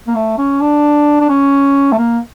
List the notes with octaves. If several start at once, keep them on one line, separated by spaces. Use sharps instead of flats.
A#3
A3
C#4
D4
D4
C#4
A3
A#3